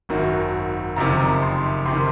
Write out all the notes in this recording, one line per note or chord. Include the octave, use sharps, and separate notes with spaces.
G#1 F#2 D#3 F#3
F#1 F2 C3 D#3 A#5
C6
F#1 C3 D#3 C6